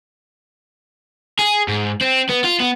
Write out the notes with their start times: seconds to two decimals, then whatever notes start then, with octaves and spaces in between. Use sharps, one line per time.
1.39 G#4
1.68 G#2
2.01 C4
2.29 B3
2.44 F4
2.60 B3